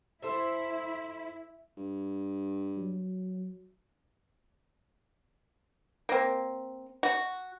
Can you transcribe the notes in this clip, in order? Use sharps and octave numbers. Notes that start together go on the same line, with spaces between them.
E4 A4 C5 E5
G2
F#3
A#3 C4
F#4